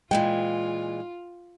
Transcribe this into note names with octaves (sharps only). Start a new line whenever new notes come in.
A#2 E3 G#3 F4 G5